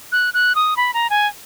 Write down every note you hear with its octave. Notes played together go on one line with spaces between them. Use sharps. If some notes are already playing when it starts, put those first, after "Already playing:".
F#6
F#6
D#6
B5
A#5
G#5